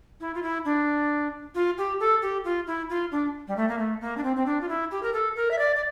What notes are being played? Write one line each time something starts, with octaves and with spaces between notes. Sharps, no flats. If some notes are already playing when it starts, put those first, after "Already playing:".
E4
F4
E4
D4
F4
G4
A4
G4
F4
E4
F4
D4
G3
A3
A#3
A3
A#3
D4
C4
C4
D4
F4
E4
G4
A#4
A4
A#4
E5
D5
D5